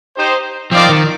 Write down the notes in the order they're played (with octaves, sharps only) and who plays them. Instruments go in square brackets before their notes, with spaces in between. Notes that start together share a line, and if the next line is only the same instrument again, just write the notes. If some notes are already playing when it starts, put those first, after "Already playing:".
[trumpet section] D#4 G4 C5
[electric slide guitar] F3 [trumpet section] C4 D#4 A#4 D5 F5
[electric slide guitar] D#3